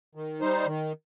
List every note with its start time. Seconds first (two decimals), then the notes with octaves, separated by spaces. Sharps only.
0.15 D#3
0.41 G3 D#4 C5
0.66 D#3